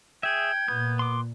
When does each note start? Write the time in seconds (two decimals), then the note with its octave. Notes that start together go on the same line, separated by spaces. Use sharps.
0.23 G#4 E5 G5 G#6
0.68 A#2 B3 G6
0.99 C6 D6